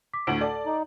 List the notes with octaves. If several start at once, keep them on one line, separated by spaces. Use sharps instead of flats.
D6 B6
D2 A2 D7 F#7
A4 D5 A5
D#4